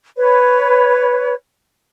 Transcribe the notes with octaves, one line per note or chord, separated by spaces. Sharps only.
B4 C#5